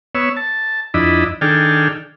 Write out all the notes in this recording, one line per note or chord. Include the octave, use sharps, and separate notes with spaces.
B3 C#5 E6
A5
F2 D4 E4 D#5 B5
D#3 D4 G#4 A4 G5 F6